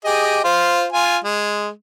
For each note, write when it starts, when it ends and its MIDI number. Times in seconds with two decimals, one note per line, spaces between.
0.05 0.40 67
0.05 0.40 68
0.05 0.40 75
0.44 0.86 65
0.44 0.86 72
0.92 1.17 65
0.92 1.17 80
1.24 1.69 56